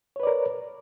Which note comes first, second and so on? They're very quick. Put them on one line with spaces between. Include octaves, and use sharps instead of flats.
C#5 B4 D5 A#4